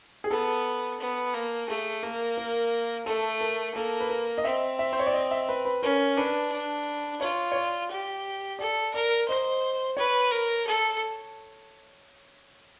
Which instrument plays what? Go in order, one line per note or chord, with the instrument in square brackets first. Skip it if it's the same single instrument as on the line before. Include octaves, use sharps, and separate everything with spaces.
[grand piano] G#4
[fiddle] B3 [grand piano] A4
[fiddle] B3
A#3
[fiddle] A3 [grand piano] G#4
[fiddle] A#3 [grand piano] A#4
[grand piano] A#4
[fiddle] A3 [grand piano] A4
[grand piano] A#4
[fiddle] A#3 [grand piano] A4
[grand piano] B4
A#4
D#5
[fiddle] C4 [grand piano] E5
[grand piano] E5
C5
C#5
D5
D#5
E5
B4
B4
[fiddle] C#4 [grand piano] A#4
[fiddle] D4 [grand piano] B4
[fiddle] D4
[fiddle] F4 [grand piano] C#5
[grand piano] C#5
D5
[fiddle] G4
[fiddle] A4 [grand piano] D5
[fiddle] A#4 [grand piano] D5
[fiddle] C5 [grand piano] D#5
[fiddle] B4 [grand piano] C#5
[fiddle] A#4
A4